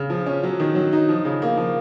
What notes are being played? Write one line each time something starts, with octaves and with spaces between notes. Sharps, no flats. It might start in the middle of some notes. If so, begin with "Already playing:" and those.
Already playing: C#3
F3
C#4
F#3
D#3
F#3
D#4
F3
C#3
A#3
F3